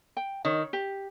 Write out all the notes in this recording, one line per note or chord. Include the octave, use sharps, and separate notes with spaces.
G5
D#3 C#5
G4